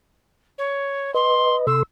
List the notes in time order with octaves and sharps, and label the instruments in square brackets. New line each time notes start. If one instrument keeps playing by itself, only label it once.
[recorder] C#5
[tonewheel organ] B4 D#5 [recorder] C6
[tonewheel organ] C3 A4 C6 [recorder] E6